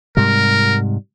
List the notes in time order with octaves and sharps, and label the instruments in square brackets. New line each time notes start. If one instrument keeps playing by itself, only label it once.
[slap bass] G#2 C3 G3 [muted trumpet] A#4